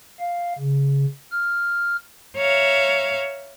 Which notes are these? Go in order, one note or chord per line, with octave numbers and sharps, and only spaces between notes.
F5
C#3
F6
C#5 E5 F5 A#5